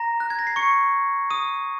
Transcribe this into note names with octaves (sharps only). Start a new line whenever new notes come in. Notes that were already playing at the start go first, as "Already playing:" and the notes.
Already playing: A#5 A#6
F#6
G#6
A#6
C7
C#6 C#7
D#6 D#7